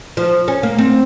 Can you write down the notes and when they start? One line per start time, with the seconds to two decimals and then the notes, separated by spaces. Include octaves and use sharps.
0.17 F3
0.48 C#4
0.63 A#3
0.79 C4